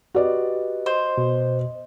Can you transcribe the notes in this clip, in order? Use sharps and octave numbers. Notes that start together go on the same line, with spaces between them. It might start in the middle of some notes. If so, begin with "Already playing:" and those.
F#4 G4 B4 D5 D#5
C5 D#5
B2